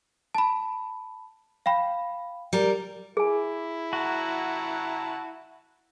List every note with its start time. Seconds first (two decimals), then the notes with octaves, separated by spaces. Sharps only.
0.35 A5 B5
1.66 F5 G5 B5
2.53 G3 A#4
3.17 E4 G#4 G#5
3.93 F#4 F#5 A5 A#5